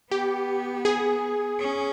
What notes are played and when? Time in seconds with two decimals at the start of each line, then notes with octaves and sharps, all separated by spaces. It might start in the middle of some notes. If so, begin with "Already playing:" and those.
0.11 B3 G4
0.85 G#4
1.59 C#4